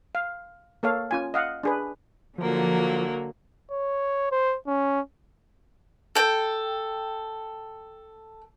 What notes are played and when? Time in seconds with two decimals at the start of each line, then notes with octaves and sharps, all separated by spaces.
0.15 F5
0.83 A#3 A4 C#5 F5
1.11 C#4 F4 G#5
1.34 D#5 F5 F#5
1.63 D4 G#4 B4
2.38 D3 F3 F#3 A#3
3.71 C#5
4.32 C5
4.67 C#4
6.15 A4 G5